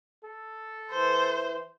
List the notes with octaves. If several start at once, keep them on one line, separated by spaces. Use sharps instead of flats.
A4
E3 C5